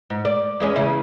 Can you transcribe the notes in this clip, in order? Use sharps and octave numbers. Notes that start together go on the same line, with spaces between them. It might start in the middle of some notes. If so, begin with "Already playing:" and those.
G#2
D5
E2 G#3 C#4
E2 C#3 E4